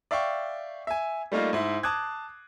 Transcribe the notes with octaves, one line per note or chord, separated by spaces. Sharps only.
D5 E5 F5 G5 C#6
E5 G#5
G3 A3 A#3 D#4 F4
G#2 E4
A5 D6 D#6 F#6 G#6